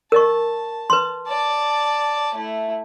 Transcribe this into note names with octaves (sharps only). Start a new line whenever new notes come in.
A#4 D#5 A5 C#6
B4 C6
D5 A5
A3 E4